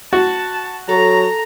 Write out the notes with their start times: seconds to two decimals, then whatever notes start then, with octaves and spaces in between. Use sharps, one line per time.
0.13 F#4 A5
0.89 F#3 A4 A#5